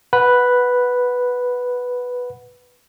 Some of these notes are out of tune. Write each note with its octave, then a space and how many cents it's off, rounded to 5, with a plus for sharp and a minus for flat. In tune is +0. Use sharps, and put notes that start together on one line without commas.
B4 +0 F#5 +0